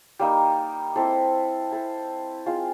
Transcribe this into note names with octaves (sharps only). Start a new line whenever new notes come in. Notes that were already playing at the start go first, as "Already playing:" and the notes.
G3 A#3 D#4
C4 E4 A4 C5
E4 A4 C5
G#3 C4 F4